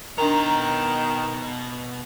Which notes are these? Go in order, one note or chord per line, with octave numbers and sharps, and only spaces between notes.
B2 D#3 D4 A#4 A#5